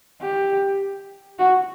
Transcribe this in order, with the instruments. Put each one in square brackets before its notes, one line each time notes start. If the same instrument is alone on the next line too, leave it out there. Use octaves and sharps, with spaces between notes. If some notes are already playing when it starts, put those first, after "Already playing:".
[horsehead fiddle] G4
F#4